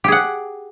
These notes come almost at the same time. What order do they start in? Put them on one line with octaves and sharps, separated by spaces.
G4 G#4 F#5